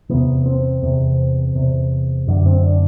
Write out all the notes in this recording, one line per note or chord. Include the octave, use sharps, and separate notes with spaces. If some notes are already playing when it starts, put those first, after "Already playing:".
E2 C3 B3
C4
E2 C3
E2 C3
F#2 D3 D4
C4
D4